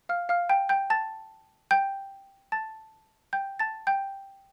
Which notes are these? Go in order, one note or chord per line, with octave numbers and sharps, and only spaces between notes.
F5 F6
F5 F6
G5 G6
G5 G6
A5 A6
G5 G6
A5 A6
G5 G6
A5 A6
G5 G6